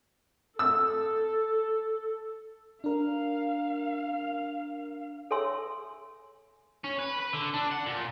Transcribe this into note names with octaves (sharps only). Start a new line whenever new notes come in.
A4 E6
D4 A#4 F5
A4 C#5 E5 G#5 C6 E6
C#4
B4
B4
D3
D4
F#5
A#2